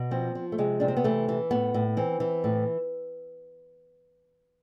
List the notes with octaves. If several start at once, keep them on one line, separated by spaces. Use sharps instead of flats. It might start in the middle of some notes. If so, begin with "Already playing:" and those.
Already playing: B2
F3 C4
F3
A3
C3 G#3
C3 D4
C4
B3
E3 A3
E3
A2 B3
A2
E3 C4
E3
A2